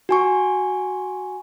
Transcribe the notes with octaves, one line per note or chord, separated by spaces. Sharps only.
F#4 G#5 C#6